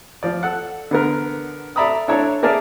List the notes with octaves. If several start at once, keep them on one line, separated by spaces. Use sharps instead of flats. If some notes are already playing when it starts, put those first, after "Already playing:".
F3 D5
A4 F#5
D3 B3 A#4
A4 D5 E5 A#5 B5 D#6
D4 E4 A4 C#5 A#5
A#3 G#4 A#4 D5 E5 A5